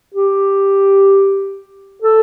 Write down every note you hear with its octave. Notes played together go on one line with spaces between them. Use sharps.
G4
A4